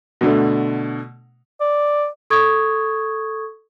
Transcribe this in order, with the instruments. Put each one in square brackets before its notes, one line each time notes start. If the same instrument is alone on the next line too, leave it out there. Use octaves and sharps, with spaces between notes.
[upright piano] B2 D3 A3
[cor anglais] D5
[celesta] A4 C#6 D#6 G#6